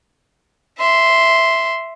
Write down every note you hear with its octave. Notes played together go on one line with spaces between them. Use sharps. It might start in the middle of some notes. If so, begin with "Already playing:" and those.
E5 C6